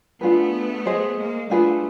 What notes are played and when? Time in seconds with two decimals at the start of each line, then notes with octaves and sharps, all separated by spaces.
0.21 A3 B3 D4 F4 G#4 B4
0.86 G#4 C5 D#5
1.18 G#3 A#3
1.50 G3 A3 D4 F4 G#4 B4